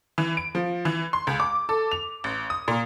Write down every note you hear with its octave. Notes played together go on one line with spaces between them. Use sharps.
E3
D7
F3
E3
C6
C#2
D6
A4
F7
A1
D#6
A#2